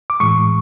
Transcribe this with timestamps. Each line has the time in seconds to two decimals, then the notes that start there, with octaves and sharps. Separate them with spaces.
0.10 D6
0.20 A2 E3 G#3 C#6